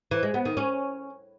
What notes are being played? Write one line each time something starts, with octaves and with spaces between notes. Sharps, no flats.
E3
G#3
B3
D#3
C#4